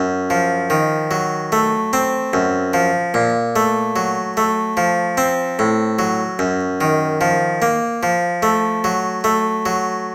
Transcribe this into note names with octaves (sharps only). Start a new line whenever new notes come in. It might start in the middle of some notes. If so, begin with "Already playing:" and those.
Already playing: F#2
F3
D#3
F#3
A3
C4
F#2
F3
A#2
A3
F#3
A3
F3
C4
A2
F#3
F#2
D#3
F3
A#3
F3
A3
F#3
A3
F#3